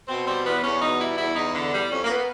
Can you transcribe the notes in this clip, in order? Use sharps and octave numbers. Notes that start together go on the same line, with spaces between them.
B2 C4
G3 C4
E2 B3
E2 C#4
B2 D#4
G3 E4
E2 E4
E2 D#4
D3
G3
F2 C#4
A#3
B3